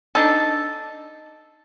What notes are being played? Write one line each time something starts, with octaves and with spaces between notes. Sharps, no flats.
D4 D#4 A4